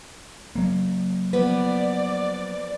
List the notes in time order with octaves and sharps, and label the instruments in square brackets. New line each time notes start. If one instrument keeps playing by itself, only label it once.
[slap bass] F#3 A#3
[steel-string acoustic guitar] F3 B3 B4 [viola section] D5